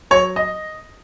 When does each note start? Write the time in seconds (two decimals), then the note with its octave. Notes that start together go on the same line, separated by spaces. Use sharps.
0.11 F#3 C#5
0.36 D#5